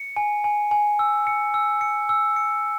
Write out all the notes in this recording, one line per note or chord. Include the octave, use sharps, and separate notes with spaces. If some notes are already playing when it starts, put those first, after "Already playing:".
Already playing: C#7
G#5
G#5
G#5
E6
C#7
E6
C#7
E6
C#7